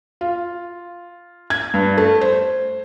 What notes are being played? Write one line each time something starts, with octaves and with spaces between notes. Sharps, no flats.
F4
G#6
G2
A3
C5